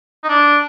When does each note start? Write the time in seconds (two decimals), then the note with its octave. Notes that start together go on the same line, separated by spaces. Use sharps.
0.24 D#4
0.29 D4